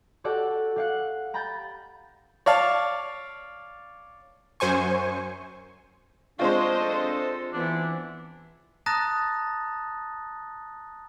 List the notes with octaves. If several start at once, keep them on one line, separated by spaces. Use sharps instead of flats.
F#4 G4 A4 D5 F#5 E6
G4 F5 F#5
G5 A#5 B5 G6 A6
C#5 D5 F5 A5
F#2 C5 G#5 C#6
G#3 C4 D4 F4 C5 C#5 D#5
A4
E3 B3 D4 E4
A5 A#5 D#6 F#6 A6 A#6